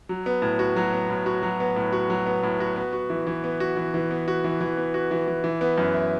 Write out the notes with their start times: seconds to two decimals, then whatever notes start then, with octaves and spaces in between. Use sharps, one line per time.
0.09 F#3
0.26 B3
0.42 A2
0.59 F#4
0.76 F#3
0.93 B3
1.10 A2
1.26 F#4
1.43 F#3
1.60 B3
1.76 A2
1.93 F#4
2.10 F#3
2.26 B3
2.43 A2
2.60 F#4
2.76 B3
2.93 F#4
3.10 E3
3.27 E3
3.44 B3
3.60 F#4
3.77 E3
3.94 E3
4.11 B3
4.28 F#4
4.44 E3
4.61 E3
4.77 B3
4.94 F#4
5.11 E3
5.28 E3
5.44 E3
5.61 B3
5.78 F#2
5.94 E4